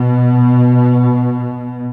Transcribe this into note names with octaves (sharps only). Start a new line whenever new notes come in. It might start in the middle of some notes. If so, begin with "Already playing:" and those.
Already playing: B2